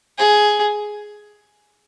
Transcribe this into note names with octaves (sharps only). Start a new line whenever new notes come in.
G#4